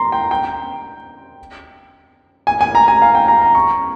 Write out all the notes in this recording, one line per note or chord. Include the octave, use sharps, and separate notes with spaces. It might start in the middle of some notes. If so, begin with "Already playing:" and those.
Already playing: A#5 C6
G5
G5
G#5
G#5
A#5
G#5
F5
G5
A#5
A#5
C#6